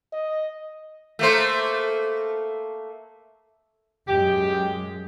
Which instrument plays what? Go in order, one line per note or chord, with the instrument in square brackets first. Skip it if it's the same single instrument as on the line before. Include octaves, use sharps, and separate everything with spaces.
[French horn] D#5
[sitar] A3 A#3 C5
[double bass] F#2 G#3 [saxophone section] G4